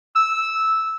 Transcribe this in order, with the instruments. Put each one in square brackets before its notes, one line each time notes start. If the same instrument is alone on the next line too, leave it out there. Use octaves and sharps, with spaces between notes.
[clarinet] E6